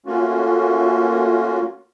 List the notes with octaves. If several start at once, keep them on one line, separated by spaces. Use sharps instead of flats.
A3 A#3 C#4 F4 F#4